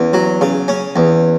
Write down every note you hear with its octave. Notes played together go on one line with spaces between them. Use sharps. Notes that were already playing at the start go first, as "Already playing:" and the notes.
Already playing: E2 C#4
F#3
C#3
C#4
E2